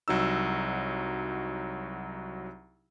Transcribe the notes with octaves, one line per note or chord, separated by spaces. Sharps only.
C2 F#3 D#4 E6